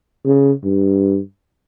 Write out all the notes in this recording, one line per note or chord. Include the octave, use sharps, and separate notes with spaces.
C#3
G2